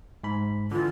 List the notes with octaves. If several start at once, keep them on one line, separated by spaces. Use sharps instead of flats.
G#2 B5
D3 E3 F4